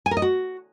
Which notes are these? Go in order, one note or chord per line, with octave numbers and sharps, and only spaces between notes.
G#5
A#4
D#5
F#4